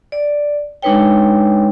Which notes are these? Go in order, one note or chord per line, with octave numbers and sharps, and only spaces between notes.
D5
G#3 D4 D#4 B4 C#5 G5